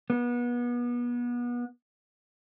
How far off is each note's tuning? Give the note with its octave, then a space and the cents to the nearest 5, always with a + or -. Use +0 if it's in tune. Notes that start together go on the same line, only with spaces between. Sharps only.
B3 -30